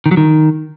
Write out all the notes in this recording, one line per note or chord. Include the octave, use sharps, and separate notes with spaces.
D#3
F#3
D#3